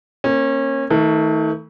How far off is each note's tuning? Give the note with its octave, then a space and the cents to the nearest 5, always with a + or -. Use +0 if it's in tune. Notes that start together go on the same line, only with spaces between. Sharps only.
A#3 +0 C#4 -30
D#3 +45 A3 +15